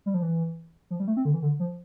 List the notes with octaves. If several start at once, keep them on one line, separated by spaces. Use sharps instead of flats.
G3
F3
E3
F3
G3
A3
C4
D3
E3
D3
F3